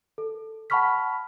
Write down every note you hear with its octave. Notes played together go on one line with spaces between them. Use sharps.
A4
F#5 A5 B5 C#6 F6 B6